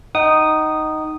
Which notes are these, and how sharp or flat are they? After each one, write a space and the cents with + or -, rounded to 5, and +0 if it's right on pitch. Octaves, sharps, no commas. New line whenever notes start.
D#4 +0 F#5 +45 D#6 -10